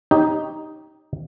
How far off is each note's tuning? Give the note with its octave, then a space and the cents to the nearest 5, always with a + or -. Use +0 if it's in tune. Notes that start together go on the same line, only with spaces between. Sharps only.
D#4 +0 G4 +0 C#5 +0